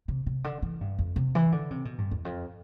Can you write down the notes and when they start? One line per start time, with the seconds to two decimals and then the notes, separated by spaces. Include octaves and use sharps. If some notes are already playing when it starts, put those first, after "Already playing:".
0.08 C3
0.26 C3
0.44 D3
0.62 E3
0.81 G2
0.99 F2
1.16 C3
1.35 E3
1.52 D3
1.71 C3
1.85 B2
1.98 G2
2.11 E2
2.25 F2